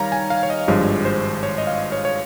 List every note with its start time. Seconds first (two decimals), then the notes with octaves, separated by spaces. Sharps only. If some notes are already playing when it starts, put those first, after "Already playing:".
Already playing: D#3 G3 C#5 F5 A#5
0.12 G#5
0.30 F5
0.43 C#5
0.50 D#5
0.68 G#1 G2 F3 G#3 C#5
1.05 C5
1.43 C#5
1.58 D#5
1.67 F5
1.92 C#5
2.05 C#5